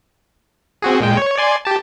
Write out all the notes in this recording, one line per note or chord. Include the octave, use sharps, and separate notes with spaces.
C4 F#4 G#4
A#2 G#3 G5
C#5
D5 G#5 C6
G4 A5